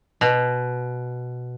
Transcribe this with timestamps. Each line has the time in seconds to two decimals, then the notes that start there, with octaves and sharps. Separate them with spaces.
0.21 B2